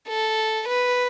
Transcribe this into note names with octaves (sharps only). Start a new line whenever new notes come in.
A4
B4